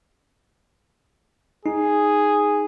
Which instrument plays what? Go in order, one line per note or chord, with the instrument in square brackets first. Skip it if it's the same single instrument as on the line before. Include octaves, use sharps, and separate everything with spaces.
[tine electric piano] D#4 [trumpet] G#4